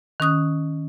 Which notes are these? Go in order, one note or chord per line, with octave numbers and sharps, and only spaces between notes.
D#3 C#4 D#6 F#6